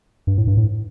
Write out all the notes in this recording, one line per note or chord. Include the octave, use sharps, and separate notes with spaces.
G2
A2
G2
A2